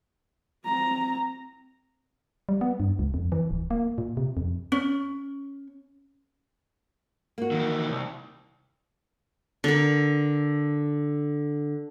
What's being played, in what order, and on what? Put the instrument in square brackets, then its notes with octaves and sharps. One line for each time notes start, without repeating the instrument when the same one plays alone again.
[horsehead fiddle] C4 A#5
[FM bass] G3
B3
G2
C#2
F2
E3
D1
A#3
A#2
C3
F2
[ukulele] C#4
[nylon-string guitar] A#3 F#4
[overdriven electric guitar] D#3 E3
C2
[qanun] D3 A#4